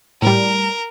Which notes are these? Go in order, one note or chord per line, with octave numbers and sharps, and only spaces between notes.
A2 G3 A#4